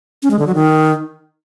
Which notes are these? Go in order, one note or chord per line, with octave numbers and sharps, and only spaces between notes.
C#4
G#3
D3
F#3
D#3